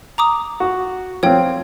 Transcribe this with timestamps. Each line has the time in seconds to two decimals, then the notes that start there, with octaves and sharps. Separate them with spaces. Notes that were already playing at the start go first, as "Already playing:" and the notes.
0.18 A#5 D6 D#6
0.60 F#4
1.23 F3 C4 C#5 G5